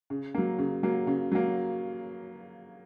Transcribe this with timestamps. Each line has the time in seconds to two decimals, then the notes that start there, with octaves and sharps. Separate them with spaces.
0.10 C#3
0.34 F#3 A#3
0.58 C#3
0.83 F#3 A#3
1.07 C#3
1.32 F#3 A#3